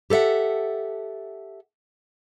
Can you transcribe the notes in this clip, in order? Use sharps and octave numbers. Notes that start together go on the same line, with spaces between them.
G4 A4 C5 E5 F#5